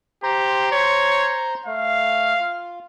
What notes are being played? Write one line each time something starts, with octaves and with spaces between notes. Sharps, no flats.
G4 C5 A#5 C6
C#5
A3 F5
F4